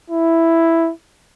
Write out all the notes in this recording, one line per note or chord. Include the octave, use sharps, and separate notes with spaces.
E4